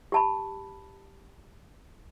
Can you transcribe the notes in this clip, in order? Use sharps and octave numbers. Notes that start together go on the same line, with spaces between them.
G4 A5 B5